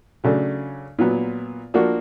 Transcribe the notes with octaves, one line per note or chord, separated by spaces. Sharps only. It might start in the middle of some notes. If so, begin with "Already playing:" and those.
C#3 F#3 A3 D4
A#2 F#3 B3
F3 A#3 D4 F#4